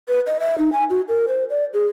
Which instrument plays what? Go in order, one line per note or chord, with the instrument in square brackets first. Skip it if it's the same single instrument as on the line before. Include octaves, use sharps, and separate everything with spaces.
[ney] B4
D#5
E5
D#4
G#5
F#4
A#4
C5
D5
G#4